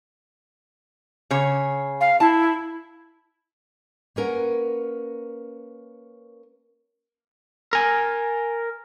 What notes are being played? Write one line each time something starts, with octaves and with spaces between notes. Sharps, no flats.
C#3 C#5
F5
E4 A5
A#3 C#4 A#4 B4 F#5
A#4 G#5